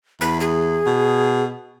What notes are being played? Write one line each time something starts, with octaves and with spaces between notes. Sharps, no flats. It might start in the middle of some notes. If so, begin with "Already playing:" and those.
E2 B5
G#4
B2